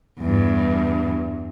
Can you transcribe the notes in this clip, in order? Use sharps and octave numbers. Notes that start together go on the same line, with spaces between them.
E2 G2